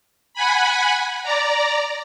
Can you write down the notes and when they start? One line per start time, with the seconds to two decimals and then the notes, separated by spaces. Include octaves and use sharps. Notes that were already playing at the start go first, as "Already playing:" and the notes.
0.34 F#5 G#5 B5
1.23 D5 A#5